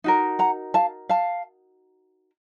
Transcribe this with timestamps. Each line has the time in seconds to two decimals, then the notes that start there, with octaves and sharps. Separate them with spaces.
0.04 D#4 F#4 A#4
0.39 F#5 A#5
0.74 F5 A5
1.09 F5 A5